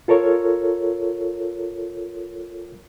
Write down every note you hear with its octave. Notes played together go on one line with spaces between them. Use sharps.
F4 A4 A#4 C#5